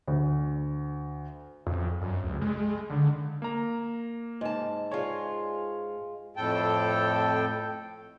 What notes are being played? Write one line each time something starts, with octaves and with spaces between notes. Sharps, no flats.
D2
F2
F#2
C#2
G#3
D3
A#3 A#5
G#2 A5
G#3 F4 C#5
F2 A2 A4 G5